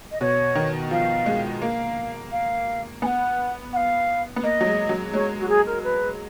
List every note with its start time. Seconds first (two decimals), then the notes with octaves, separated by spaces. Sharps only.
0.11 D#5
0.21 B2 C#5
0.55 D#3
0.91 F3 F5
1.26 G#3
1.62 A#3 F5
2.32 F5
3.02 B3 G#5
3.06 F#5
3.73 F#5
3.76 F5
4.36 B3
4.43 A#3 D#5
4.61 F#3
4.66 G#3
4.89 F#3
5.13 G#3 C#5
5.40 F#4
5.49 G#4
5.66 A#4
5.84 B4